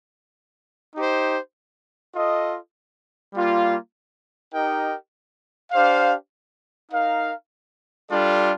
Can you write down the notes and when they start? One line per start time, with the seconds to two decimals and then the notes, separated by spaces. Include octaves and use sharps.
0.96 D#4 G4 C5
2.15 F4 A4 D#5
3.34 G3 A#3 F4
4.53 D#4 G4 A#4 D#5 G5
5.72 D4 G4 C5 F5
6.92 D#4 A#4 F5
8.10 G3 D4 F4 A4 D5